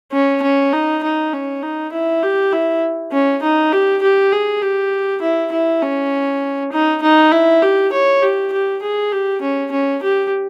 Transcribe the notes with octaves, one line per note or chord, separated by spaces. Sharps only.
C#4
C#4
D#4
D#4
C#4
D#4
E4
G4
E4
C#4
D#4
G4
G4
G#4
G4
E4
E4
C#4
D#4
D#4
E4
G4
C#5
G4
G4
G#4
G4
C#4
C#4
G4